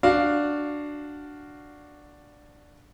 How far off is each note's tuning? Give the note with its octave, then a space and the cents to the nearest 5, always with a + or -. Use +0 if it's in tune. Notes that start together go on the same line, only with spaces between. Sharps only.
D4 +0 F#4 +0 F5 +0